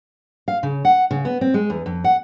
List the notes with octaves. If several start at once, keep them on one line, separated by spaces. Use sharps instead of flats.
F5
C#3
F#5
C#3
B3
C4
G#3
E2
F2
F#5